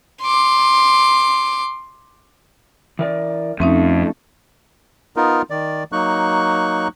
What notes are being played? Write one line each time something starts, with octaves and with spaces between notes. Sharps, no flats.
C6 D6
E3 A#4 D5
F2 A3 C4 C#4 D#4
B3 D#4 F4 A#4
D#3 D5
F#3 A#3 D#4 C#6 F#6